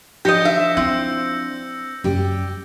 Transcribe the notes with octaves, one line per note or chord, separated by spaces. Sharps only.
F3 D4 F4 G4 D#5 G6 A#6 C#7
E5
C4 E4 E6
F#2 G3 G4